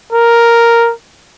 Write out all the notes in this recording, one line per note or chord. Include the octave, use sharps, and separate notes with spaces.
A#4